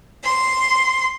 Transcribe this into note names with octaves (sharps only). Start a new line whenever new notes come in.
C6